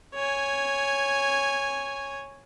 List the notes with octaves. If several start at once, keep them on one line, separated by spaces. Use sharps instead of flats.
C#5 G#5